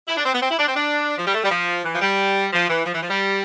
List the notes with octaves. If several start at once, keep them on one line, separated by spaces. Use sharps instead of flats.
E4
D4
C4
B3
C4
E4
D4
C4
D4
F3
G3
A3
G3
F3
E3
F3
G3
F3
E3
F3
E3
F3
G3